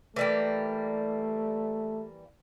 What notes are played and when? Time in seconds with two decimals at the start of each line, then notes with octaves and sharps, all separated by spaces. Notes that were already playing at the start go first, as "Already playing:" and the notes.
0.16 E3 G3 A3 A#3